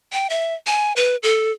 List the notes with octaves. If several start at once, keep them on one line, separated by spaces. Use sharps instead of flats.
G5
E5
G#5
B4
A4